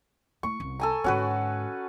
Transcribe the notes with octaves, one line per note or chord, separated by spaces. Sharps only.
A3 E4 C#6
C2 C#4
A4 G#5 A#5
G#2 D3 C#4 F#4 B4